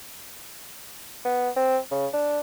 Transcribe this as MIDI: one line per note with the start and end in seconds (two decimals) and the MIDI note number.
1.25 1.50 59
1.56 1.78 60
1.91 2.07 49
2.14 2.40 62